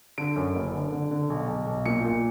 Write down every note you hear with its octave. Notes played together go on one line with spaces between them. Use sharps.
D3 D7
F#2
F#1
D3
D3
D3
B1
B1
B1
A#2 C#7
A#2